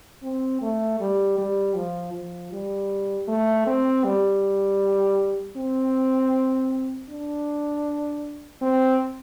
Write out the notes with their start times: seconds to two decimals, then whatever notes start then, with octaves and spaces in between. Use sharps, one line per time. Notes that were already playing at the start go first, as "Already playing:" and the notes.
0.23 C4
0.62 A3
1.00 G3
1.38 G3
1.76 F3
2.14 F3
2.52 G3
3.28 A3
3.67 C4
4.05 G3
5.57 C4
7.09 D4
8.62 C4